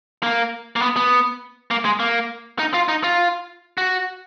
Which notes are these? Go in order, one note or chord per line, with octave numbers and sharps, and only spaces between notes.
A#3
A#3
B3
B3
A#3
G#3
A#3
D#4
F4
D#4
F4
F#4